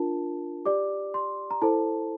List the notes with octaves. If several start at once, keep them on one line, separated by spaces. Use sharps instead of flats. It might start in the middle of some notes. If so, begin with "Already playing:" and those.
Already playing: D4 F4 A#4 A5
G4 D5 D6
C6
A#5
E4 A4 C5 A5